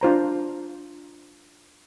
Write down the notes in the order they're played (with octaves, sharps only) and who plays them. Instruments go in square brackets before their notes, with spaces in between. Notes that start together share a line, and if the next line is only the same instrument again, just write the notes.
[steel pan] D4 F4 C5 A#5